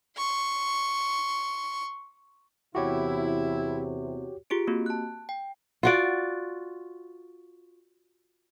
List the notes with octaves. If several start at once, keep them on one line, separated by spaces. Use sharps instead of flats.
C6 C#6
E2 C3 E4 F#4 G4 C#5
F4 G4 G#4 D7
A#3 C4 F#4 G4
A5 F#6
G5
F4 F#4 D5